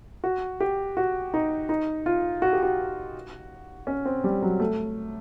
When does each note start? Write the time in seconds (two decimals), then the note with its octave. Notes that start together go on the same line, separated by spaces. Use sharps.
0.24 F#4
0.60 G4
0.97 F#4
1.34 D#4
1.69 D#4
2.06 F4
2.42 F#4
2.53 G4
2.63 F#4
3.87 C#4
4.05 C4
4.24 G3
4.43 F#3
4.60 A3